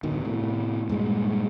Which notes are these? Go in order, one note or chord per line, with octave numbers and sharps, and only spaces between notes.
D1 G1 B2 D#3
A2 C3
G2 A#2 G#3